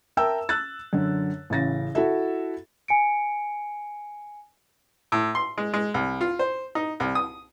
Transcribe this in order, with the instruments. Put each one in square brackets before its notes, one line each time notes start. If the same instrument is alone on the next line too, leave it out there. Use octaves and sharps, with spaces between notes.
[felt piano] A#4 E5 G5 A5 E6
E6 F#6 A6
F#2 D3
A1 C#3 A6 A#6
E4 F#4 A4 E5
[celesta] G#5 C#7 D7
[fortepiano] A2
C6
G#3
G#3
C2
F4
C5
D#4
C2
D#6